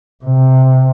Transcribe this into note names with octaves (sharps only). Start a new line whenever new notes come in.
C3